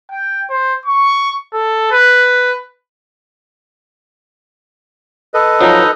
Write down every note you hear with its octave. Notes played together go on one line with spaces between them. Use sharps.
G5
C5
C#6
A4
B4
A4 B4 D#5
F3 F#3 D#4